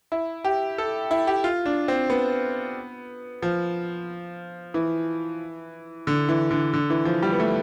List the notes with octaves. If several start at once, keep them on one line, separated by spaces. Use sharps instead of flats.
E4
G4
A4
E4
G4
F4
D4
C4
B3
F3
E3
D3
E3
D3
D3
E3
F3
G3
B3
A3